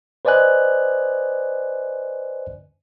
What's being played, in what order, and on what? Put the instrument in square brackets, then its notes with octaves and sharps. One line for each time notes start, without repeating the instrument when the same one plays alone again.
[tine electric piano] B4 C5 D5 D#5 G#5 F#6